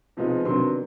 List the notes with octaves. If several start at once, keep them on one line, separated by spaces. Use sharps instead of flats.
C3 F3 G#3 B3 D#4
C3 D#3 F#3 B3 D4 C6